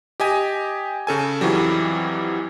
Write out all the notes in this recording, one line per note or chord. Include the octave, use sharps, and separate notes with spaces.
G4 D#5 G#5
C#3 A4 G#5
F2 E3 F#3 G3